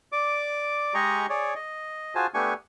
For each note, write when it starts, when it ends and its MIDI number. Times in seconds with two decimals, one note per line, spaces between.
0.12 0.94 74
0.12 0.94 86
0.94 1.26 56
0.94 1.26 67
0.94 1.26 68
0.94 1.26 75
0.94 1.26 82
0.94 1.26 85
1.29 1.54 68
1.29 1.54 73
1.29 1.54 74
1.55 2.14 75
2.15 2.27 65
2.15 2.27 66
2.15 2.27 68
2.15 2.27 72
2.15 2.27 80
2.15 2.27 81
2.34 2.54 57
2.34 2.54 59
2.34 2.54 62
2.34 2.54 67
2.34 2.54 80
2.34 2.54 85